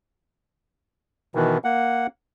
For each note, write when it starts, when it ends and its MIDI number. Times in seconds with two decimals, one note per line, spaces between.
1.35 1.58 47
1.35 1.58 51
1.35 1.58 52
1.64 2.07 58
1.64 2.07 78